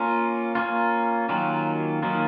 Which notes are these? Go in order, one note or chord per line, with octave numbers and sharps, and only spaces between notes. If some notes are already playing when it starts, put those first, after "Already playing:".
Already playing: A#3 C#4 F4
A#3 C#4 F4
D#3 F#3 A#3 C#4 F4
D#3 F#3 A#3 C#4 F4